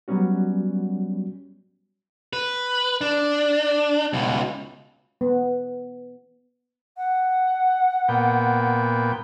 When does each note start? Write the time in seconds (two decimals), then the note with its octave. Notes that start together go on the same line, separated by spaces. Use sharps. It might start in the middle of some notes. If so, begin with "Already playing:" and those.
0.08 F#3 G3 B3 C#4 F#4
2.33 B4
3.01 D4
4.13 C#2 B2
5.21 B3
6.97 F#5
8.08 A#2 B3 G5